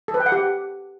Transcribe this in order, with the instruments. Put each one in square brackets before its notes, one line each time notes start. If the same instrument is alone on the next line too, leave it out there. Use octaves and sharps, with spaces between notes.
[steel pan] A4
B4
G5
F#5
G4